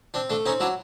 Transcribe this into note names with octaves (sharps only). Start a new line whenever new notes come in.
C4 D4
A3 D4
C4 C#4 D#4
F#3 D4 E4